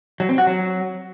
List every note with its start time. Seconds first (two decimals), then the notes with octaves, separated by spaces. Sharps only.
0.20 F#3
0.29 C4
0.38 F#4
0.47 F#3